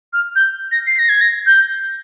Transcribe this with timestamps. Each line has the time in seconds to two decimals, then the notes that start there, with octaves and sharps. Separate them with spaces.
0.13 F6
0.36 G6
0.72 A#6
0.87 C7
0.99 A#6
1.09 G#6
1.21 A#6
1.46 G6